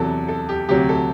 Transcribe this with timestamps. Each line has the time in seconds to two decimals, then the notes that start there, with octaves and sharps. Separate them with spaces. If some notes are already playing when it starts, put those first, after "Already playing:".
Already playing: E2 C3 F#3 A4
0.28 A4
0.49 G4
0.69 D2 C3 F#3 G4
0.89 A4